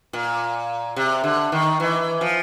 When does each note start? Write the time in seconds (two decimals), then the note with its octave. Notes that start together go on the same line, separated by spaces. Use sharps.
0.13 A#2
0.96 C3
1.24 D3
1.52 D#3
1.80 E3
2.21 F3